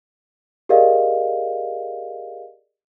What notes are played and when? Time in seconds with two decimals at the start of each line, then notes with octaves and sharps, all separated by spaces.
0.69 G4 G#4 A#4 D5 D#5 F5